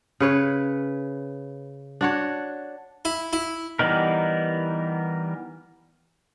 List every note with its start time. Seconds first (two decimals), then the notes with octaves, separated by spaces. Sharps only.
0.20 C#3 B4 C#5
2.01 D4 F#4 C#5
3.05 E4
3.33 E4
3.79 E3 G3 B3 D#4 A#4